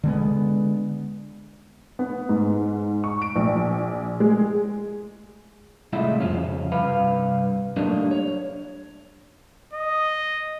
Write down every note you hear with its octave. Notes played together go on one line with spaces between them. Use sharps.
D3 G#3 B3
B3
G#2
C#6
D7
A#1
G#3
C2 A2 G#3 E4 F4 E5
F2 G#2 C#3 F3 C#4
C2 G2 B4 F5
F#3 G3 A3 A#3 D4 D#4
C#5
D#5